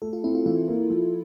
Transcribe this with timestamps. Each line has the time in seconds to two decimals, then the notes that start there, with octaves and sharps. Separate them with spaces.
0.02 A3 A4
0.13 F4
0.24 C4 E4
0.35 F4
0.46 E3 F4
0.68 A#3
0.90 F3